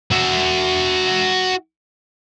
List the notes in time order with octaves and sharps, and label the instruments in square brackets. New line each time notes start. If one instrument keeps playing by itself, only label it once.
[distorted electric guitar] F#4 E5